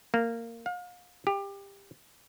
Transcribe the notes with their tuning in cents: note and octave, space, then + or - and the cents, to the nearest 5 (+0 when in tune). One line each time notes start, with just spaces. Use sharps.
A#3 -15
F5 +40
G4 +20